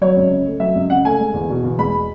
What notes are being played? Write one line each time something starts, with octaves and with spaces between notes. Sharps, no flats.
F#3 C#5
C#2
C#3
A3
F#3 E5
C#2
C#3 F#5
A3 G#5
G#3
E2
B2
E2
G#3 B5